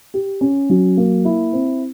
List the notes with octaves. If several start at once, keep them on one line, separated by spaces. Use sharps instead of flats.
G4
C#4
F#3
A#3
E4
C4